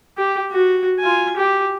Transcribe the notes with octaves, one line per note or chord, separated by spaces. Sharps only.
G4
F#4
F4 G#5
G4